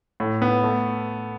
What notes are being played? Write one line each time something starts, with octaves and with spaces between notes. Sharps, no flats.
A2
B3
A3